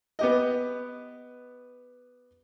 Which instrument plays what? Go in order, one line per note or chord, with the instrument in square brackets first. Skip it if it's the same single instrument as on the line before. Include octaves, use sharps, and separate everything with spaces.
[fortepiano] B3 G4 D#5